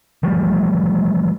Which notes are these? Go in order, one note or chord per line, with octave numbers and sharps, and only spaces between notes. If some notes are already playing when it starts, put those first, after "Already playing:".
E3 F3 G3 A3